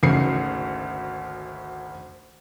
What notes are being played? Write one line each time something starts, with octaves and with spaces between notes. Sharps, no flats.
G#1 D2 C#3 C7 C#7